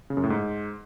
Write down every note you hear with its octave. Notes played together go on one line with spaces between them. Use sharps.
C#3
F#2
A2
G#2